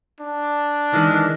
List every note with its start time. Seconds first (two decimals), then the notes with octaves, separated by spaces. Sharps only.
0.20 D4
0.93 D#3 E3 G#3